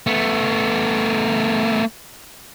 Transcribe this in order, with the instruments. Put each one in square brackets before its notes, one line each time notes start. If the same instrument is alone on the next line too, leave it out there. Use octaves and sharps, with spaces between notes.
[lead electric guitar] A3 B3